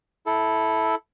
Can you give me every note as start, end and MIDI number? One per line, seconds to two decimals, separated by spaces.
0.26 0.95 64
0.26 0.95 69